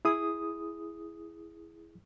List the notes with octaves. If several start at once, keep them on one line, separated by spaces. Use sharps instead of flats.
E4 G#4 D#6